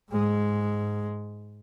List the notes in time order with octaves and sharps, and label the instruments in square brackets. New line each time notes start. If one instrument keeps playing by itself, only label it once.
[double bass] G#2 G#3